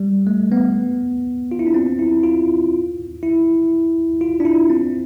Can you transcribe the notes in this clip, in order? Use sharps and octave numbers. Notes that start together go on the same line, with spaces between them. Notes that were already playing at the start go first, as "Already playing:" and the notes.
Already playing: G3
A3
B3
F4
E4
D4
C4
E4
F4
E4
F4
D4
E4
C4